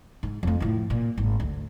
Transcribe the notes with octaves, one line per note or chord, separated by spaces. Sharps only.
G#2
F2 A3
A2 F3
A#2
G#1
D2